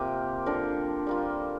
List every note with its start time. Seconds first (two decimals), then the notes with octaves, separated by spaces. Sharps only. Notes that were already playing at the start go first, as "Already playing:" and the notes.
Already playing: C3 A#3 F4 G4 A#4
0.46 D3 F3 D4 A#4
1.07 G3 A#3 F4